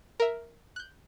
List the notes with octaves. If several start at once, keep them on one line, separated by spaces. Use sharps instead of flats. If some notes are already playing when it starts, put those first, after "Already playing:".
A#4 E5
F#6 G6